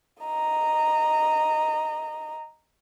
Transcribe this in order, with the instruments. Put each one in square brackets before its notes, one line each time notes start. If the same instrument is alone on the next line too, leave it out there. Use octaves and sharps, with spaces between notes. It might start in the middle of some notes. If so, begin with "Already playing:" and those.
[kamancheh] D#5 A#5